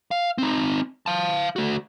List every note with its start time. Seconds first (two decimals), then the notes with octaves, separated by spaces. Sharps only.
0.11 F5
0.38 C4 D#4
1.06 F5 A5
1.56 A3 F#4